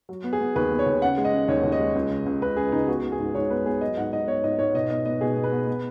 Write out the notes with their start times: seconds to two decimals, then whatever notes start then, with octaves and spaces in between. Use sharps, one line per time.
0.09 F#3
0.24 B3
0.33 G#4
0.40 B3
0.56 D#2 B4
0.71 B3
0.79 C#5
0.86 D#2
1.02 C#3 F#5
1.17 G#3
1.25 D#5
1.33 C#3
1.48 D#2 C#5
1.64 D#2
1.72 D#5
1.79 G#3
1.95 C#2
2.10 C#3
2.26 C#2
2.42 C#2 B4
2.57 C#3 G#4
2.72 C#2 D#4
2.88 B3 F#4
3.04 B3
3.12 G#4
3.19 G#2
3.35 G#2 C#5
3.50 B3 B4
3.66 B3 G#4
3.81 F#3 D#5
3.97 G#2 F#5
4.12 G#2 D#5
4.27 B3 C#5
4.44 G#2 D#5
4.59 G#2 C#5
4.75 B2 D#5
4.89 B3 D#5
5.05 B3 D#5
5.21 B2 G#4
5.36 B3
5.44 B4
5.52 B3
5.67 B3